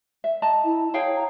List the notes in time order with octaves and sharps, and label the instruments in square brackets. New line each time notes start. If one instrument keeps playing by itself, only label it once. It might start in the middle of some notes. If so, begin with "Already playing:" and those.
[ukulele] E5
D#5 A5 A#5
[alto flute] E4
[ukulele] G#4 F5 G5 [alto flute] C#5
[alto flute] A#5